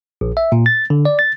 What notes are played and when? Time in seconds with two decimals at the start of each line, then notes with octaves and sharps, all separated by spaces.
0.21 A#1
0.37 E5
0.52 A#2
0.66 A6
0.90 D3
1.05 D5
1.19 A6